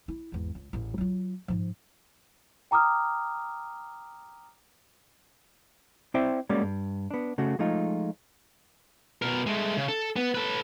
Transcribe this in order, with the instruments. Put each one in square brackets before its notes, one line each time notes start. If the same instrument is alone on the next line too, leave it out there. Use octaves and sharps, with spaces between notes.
[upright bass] E4
G#1 E2
C#2
A1 E2
F#3 F4
G#2 F3
[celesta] G5 A#5 D6 D#6 F6
[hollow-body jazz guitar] C4 E4 C5 D5 E5 G5
G3 G#3 A#3 C#4 F#4 D5
G2
B3 D4
C#3 A3 F#4
F3 G#3 A3 D#4 F4
[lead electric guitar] B2 A#4
G#3 A3
C#3
A4
B3
A4 B4